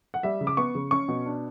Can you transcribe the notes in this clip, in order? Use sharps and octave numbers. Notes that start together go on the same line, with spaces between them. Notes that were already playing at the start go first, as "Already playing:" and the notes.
F#5
G3 E5
C#3
D6
B3 C#6
C#3
C#4 C#6
B2
D4